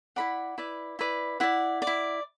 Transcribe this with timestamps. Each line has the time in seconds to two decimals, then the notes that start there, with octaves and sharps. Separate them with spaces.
0.16 E4 B4 D5 F#5 B5
0.58 E4 B4 D5
0.99 E4 B4 D5
1.40 E4 D5 F#5
1.82 D5
1.87 E4